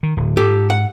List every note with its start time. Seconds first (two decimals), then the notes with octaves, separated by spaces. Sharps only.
0.03 D#3
0.17 D1
0.37 G#2 G4 A4
0.70 F#5